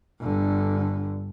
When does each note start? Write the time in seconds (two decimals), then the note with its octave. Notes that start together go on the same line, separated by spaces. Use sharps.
0.20 G1 D3